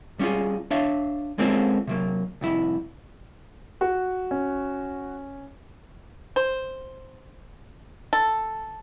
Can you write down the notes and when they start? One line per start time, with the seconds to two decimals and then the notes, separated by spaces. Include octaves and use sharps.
0.19 G3 C#4 D#4 F4 G#4
0.71 D4 C#5 E5 F5
1.38 G#3 A#3 C4 C#4 F4 A4
1.87 C3 F#3 A#3
2.41 C2 F2 E4
3.81 F#4
4.31 C#4
6.36 C5
8.13 A4